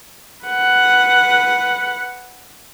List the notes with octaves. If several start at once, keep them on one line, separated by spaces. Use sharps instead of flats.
B4 F#5